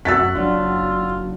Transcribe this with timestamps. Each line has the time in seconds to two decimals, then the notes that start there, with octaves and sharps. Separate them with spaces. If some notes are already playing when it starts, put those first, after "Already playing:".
0.05 F#2 F#4 F#5 E6 A6 B6
0.35 F#1 F#3 D4 F4